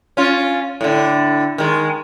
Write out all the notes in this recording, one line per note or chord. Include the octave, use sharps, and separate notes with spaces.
C#4 F4
A2 D3
D#3 G#3